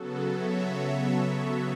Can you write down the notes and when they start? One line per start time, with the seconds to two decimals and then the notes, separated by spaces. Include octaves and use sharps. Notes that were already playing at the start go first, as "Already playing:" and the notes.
Already playing: C#3 F#3 B3 F#4 A4
0.34 C#5 E5